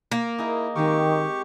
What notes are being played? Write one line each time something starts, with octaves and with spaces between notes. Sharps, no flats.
A#3
D#4 E4 G#4 A#4
D#3 G#3 C4 G4 A#4 C#6